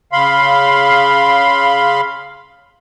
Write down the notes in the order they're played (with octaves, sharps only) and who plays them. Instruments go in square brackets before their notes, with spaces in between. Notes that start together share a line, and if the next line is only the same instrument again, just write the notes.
[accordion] C#3 F5 B5 C6